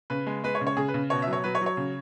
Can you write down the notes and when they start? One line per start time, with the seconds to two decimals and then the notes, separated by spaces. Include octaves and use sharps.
0.10 C#3 B4
0.26 G#3
0.44 G#3 B4
0.55 C#5
0.61 C#3
0.67 C#5
0.77 C#3 G#4
0.88 B4
0.94 C#3
1.10 B2 C#5
1.22 E5
1.27 F#3
1.33 C#5
1.44 F#3 B4
1.55 C#5
1.61 F#3
1.66 C#5
1.77 C#3